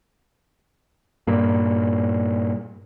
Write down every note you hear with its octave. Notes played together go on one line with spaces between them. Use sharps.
G2 A#2